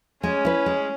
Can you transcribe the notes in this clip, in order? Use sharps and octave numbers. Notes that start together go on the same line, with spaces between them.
G#3 C#4
E4 B4
G#3